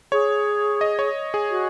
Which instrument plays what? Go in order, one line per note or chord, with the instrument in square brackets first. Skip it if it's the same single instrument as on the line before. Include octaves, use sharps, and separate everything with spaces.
[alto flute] G#4 [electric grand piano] C#5
[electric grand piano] D#5
C#5
G#4
[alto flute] F#4